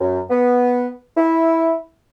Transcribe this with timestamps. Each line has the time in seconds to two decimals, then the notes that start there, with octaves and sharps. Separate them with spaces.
0.01 F#2
0.30 B3
1.16 E4